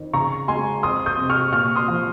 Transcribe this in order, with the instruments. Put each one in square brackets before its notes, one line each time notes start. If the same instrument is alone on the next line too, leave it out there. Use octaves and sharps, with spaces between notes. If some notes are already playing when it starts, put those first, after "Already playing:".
Already playing: [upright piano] F2 D#3
C#3 A#5 C#6
G#3 G#5 C6
F2 C6 D#6
D#6 G6
C3
C#6 F6
A#2 C#6 F6
C6 D#6
F3